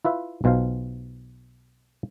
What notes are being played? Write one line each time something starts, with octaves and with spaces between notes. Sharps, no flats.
E4 F4 B4 E5
B1 B2 F4 C5 F5